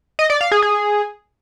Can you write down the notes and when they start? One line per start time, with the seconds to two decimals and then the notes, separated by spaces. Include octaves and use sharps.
0.19 D#5
0.30 D5
0.41 F5
0.52 G#4
0.62 G#4